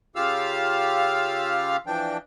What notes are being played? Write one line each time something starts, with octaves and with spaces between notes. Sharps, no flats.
C#3 F4 G4 F5 E6 F6
E3 F3 D4 G5